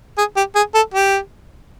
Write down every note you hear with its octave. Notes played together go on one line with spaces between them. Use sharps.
G#4
G4
G#4
A4
G4